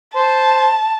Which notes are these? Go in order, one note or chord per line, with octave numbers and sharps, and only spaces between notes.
C5 A5